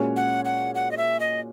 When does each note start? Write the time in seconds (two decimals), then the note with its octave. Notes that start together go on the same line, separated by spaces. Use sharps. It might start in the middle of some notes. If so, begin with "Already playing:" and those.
Already playing: A#2 G#3 C#4 F#4 C#5
0.16 F#5
0.45 F#5
0.75 F#5
0.91 D#5
0.97 E5
1.20 D#5